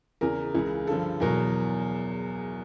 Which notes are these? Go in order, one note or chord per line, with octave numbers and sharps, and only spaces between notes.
E2 C#3 E3 A#4
C#2 C#3 E3
G2 D3 F3 A4
E2 B2 F#3 A#4